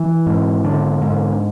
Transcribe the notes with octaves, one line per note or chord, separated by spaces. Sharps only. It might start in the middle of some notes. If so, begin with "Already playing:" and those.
Already playing: E3
G#2
D3
G#2